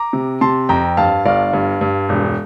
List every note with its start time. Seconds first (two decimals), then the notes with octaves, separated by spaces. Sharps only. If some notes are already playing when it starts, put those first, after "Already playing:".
Already playing: A#5 D6
0.13 C3
0.41 C3 A5 C6
0.69 F2 G5 A#5
0.97 G2 F5 A5
1.25 G1 D5 F5
1.53 G2
1.81 G2
2.09 E1